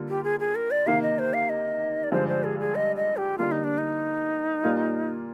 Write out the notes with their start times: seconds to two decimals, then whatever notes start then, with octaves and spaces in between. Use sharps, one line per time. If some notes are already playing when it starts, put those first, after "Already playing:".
Already playing: D3 G3 A#3 F4
0.09 G4
0.24 G#4
0.40 G#4
0.55 A#4
0.71 D5
0.86 C3 D#3 A#3 F5
1.02 D#5
1.19 C5
1.34 F5
1.49 D#5
2.04 D5
2.12 G2 D3 F3 G#3 C5
2.28 C5
2.44 G#4
2.60 G#4
2.75 D#5
2.96 D#5
3.17 G4
3.38 D3 G3 A#3 F4
3.52 D#4
3.64 D4
3.78 D#4
4.63 A#2 G3 A#3 F4